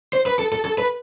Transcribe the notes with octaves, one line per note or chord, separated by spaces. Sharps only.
C5
B4
A4
A4
A4
B4